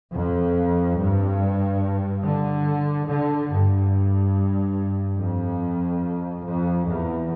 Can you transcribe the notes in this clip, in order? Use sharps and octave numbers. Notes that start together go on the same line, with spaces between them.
F2
G2
D3
D3
G2
F2
F2
E2